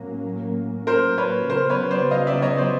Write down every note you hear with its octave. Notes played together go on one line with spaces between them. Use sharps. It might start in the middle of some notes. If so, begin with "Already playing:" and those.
Already playing: A2 F#3 A#3 C#4
A#4 C5
B4 C#5
C#3 F#3 B3 A#4 C5
B4 C#5
C5 D5
D#5 F5
D5 E5
C#5 D#5
C5 D5